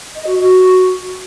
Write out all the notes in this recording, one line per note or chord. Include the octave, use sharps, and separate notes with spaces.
D#5
F#4
F#4